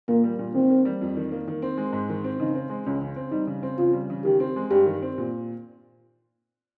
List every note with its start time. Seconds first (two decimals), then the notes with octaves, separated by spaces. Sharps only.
0.08 A#2 A#3
0.24 G3
0.39 A#2
0.55 D#3 C4
0.70 A#3
0.85 G3
1.01 F2
1.17 D#3
1.32 A#3
1.48 D#3
1.62 C4
1.78 G#3
1.93 G#2
2.09 D#3
2.24 C4
2.39 C#3 D#4
2.56 C4
2.70 G#3
2.85 C#2 C#4
3.01 C#3
3.16 C4
3.32 G3 D#4
3.47 C#3
3.63 C4
3.78 C#3 F4
3.93 G3
4.10 C#3
4.24 D#3 G4
4.40 C4
4.56 G#3
4.71 G2 G4
4.86 D#3
5.02 C4
5.18 A#2